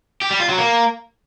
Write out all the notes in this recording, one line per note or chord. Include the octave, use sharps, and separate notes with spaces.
G4
G3
F4
F#3
A#3